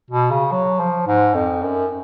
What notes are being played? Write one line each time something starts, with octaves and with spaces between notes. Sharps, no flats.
B2
C#3
F#3
F3
G#2
F2
F#2